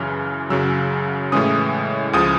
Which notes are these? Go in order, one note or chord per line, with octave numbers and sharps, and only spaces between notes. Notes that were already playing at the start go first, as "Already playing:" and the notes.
Already playing: F#2 C#3 E3 F6
F#2 C#3 F#3 E6
A2 E3 G#3 C#4 D#6
C#2 C#3 F3 D#6